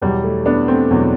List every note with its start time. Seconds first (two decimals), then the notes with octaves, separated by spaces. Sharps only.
0.01 E2 B2 F#3 G3
0.23 A3
0.46 B3 D4
0.68 A3 C4
0.91 E2 B2 F#3